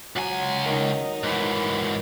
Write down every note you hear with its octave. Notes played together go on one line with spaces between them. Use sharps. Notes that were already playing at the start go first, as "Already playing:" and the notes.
C#2 F#3 G#5
D#3 D#4
G#2 E3